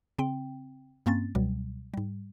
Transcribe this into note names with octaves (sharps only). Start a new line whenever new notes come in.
C#3 C4 G5
G2 A#3 C4 C#4 A6
C#2 B2 F#3 G3
G#2 G3